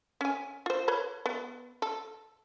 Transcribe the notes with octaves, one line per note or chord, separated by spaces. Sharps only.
C#4 G#5
F4 C5
B4 C#5 B5
B3
A4